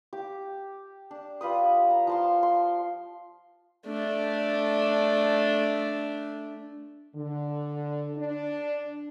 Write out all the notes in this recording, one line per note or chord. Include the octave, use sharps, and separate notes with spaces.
G4 D6
D4
G3 F4 B4 D#6
A#5
F3 A5 C6
C6
A3 D4
D3
D4